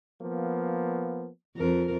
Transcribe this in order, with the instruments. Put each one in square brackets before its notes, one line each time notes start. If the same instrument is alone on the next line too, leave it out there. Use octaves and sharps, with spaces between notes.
[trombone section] F3 A#3 B3
[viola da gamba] F2 A#4